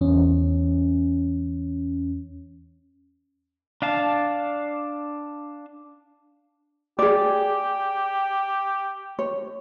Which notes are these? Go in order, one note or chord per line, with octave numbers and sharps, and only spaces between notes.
E2 C#4
D4 F5 A5
G4 G#4 D5
C#5